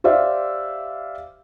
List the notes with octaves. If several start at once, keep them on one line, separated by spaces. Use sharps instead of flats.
G4 C5 D5 E5 F5